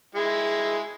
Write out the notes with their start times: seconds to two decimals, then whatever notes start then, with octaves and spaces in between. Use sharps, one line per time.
0.15 G#3 E4